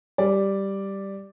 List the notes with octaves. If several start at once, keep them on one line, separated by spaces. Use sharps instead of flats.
G3 D5